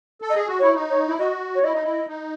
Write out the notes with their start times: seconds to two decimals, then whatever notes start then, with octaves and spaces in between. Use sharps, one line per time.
0.22 A4
0.29 D#5
0.35 G#4
0.48 F#4
0.59 E4 C#5
0.74 D#4
0.90 C#5
1.08 E4
1.19 F#4 D#5
1.55 C#5
1.63 E4 D#5
1.74 D#4
1.83 E4
2.08 D#4